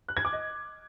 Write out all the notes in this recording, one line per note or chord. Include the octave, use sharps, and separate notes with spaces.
F#6
G#6
D6
D#5